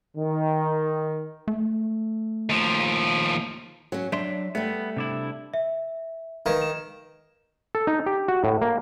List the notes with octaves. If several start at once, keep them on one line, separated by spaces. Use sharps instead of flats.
D#3
A3
D#2 F3
F#3 C#4
F#3 D4 E5 C6
G3 A3 B3
C3 D4 E4
E5
D#3 B4 F5 G#6
E7
A4
D#4
G4
F#4
A2
A#3